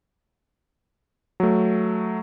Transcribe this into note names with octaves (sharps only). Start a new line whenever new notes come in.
F#3 A3